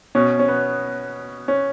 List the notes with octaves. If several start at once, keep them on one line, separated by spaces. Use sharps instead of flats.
B2 C#4
C#4
B3
C#4